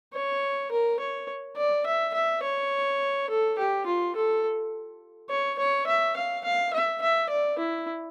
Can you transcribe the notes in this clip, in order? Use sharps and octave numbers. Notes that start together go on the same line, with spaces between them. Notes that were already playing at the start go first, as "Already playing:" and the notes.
C#5
A#4
C#5
D5
E5
E5
C#5
A4
G4
F4
A4
C#5
C#5
E5
F5
F5
E5
E5
D5
E4